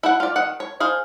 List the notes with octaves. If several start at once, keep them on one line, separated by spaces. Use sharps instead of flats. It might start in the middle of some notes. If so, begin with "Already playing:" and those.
E4 F#4 F#5
F4 D5
D#3 F#5
C#5
G#4 C5 F5